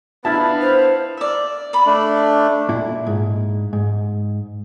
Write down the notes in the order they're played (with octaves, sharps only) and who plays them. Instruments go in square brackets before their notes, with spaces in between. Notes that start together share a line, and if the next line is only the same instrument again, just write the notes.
[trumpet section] B3 F5 [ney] D4 [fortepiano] E4 A5
[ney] C5
[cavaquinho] D5 E5
D5 B5
[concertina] A3 D4
[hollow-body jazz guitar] A#2 E4
G#2
G#2